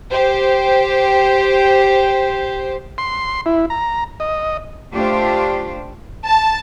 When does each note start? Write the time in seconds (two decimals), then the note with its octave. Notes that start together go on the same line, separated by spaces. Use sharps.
0.11 G4 C5
2.98 C6
3.46 E4
3.70 A#5
4.20 D#5
4.93 A3 D4 F4 G4 C5 F5
6.25 A5